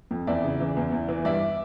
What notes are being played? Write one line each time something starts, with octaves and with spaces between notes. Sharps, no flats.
F2
E2 D5 E5
C#3
E3
E2
E2
E3
G2 D5 E5